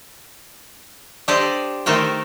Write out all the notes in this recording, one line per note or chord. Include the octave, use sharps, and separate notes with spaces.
D4 G4 A4 C5 D5 D#5
D#3 A3 A4 A#4 C5 G5